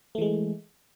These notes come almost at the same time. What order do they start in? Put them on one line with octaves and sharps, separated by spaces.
A3 E3 G#3